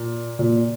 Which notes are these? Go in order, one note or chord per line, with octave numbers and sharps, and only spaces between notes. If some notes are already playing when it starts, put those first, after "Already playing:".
Already playing: A#2
A#2